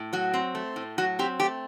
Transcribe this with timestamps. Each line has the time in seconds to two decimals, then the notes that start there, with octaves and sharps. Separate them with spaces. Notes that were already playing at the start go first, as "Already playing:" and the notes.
Already playing: A2
0.13 F#3 F#4
0.34 C4
0.55 A3
0.76 A2
0.98 F#3 F#4
1.19 C4 G4
1.40 A3 G4